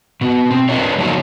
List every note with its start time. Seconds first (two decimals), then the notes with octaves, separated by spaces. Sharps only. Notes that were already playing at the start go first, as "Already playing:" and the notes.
0.21 B2 B3
0.51 C4
0.69 D4 F4 B4 C#5 D#5
0.98 C#3 F3 F#3 A#3 D#4 C#5